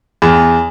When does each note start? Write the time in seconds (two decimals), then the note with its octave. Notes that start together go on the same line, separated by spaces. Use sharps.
0.22 E2